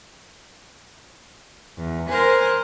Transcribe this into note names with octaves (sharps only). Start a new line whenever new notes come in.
E2
A#4 C5 G#5 F#6